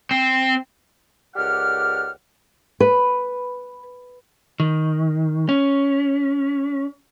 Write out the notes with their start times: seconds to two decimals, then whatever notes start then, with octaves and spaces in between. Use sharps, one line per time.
0.11 C4
1.36 C#2 G4 A#4 D5 F#5 F6
2.80 B4
4.60 D#3
5.49 C#4